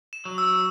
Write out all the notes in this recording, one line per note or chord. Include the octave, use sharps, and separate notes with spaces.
E7
F#3
E6